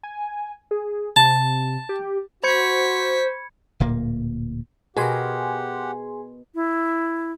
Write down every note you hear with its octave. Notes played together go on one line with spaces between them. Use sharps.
G#5
G#4
C3 A5
G4
F#4 C5 B5 C#6 G#6 B6 C#7
D1 A#2 A#3
B2 G4 G#4 A#4 F#5 G#5 C6
E4